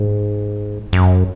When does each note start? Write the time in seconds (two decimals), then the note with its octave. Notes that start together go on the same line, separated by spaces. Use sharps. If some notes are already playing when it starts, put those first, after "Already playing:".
Already playing: G#2
0.93 F#2